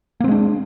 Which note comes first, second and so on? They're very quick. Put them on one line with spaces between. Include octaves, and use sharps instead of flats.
A#3 C4 G#3 D4